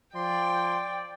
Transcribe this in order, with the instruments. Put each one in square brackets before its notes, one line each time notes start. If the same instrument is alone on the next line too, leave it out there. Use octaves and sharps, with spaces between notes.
[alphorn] F3 [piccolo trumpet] D5 [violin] G5 [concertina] C6